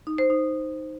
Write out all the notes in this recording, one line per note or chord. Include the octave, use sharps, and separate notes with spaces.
D#4
C5
D#4